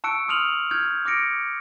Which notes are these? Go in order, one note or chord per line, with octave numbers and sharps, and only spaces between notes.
A5 C#6 E6 F#6 C#7 D7
C6 D#6 F6 D#7 F7 F#7
C#6 F6 G6 G#6
D6 F6 A#6 C#7 D7